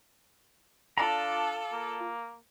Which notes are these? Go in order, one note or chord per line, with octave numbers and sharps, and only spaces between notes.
D4 F4 A4 D5 A#5
A#3